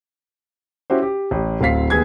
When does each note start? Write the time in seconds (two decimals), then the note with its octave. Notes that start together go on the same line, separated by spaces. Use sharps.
0.90 C#4 E4 F#4 G4 C5
1.02 G4
1.31 A1
1.61 D1 C4 F5 B6 C7
1.90 D#2 B3 G#4 G#6